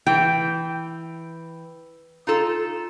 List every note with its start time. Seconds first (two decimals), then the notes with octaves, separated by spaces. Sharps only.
0.07 E3 G5
2.27 D#4 F4 A4